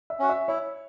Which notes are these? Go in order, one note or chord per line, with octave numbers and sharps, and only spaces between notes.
E5
C#4 F#4
E5
E4 C#5